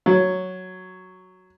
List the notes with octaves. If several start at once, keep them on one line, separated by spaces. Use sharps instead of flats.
F#3